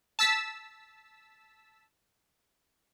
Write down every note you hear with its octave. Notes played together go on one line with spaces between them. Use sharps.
A5 E6 B6